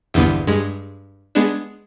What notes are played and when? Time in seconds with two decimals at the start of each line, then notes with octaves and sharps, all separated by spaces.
0.14 A#1 E2 G2 D3 B3
0.47 G2 G#3
1.35 G#3 B3 D4